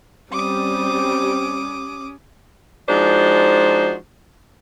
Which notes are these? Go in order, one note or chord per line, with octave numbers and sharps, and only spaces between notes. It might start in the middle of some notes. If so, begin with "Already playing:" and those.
G3 C4 C#4 D6 D#6
F3 G#3 D4 D#4 F#4 C5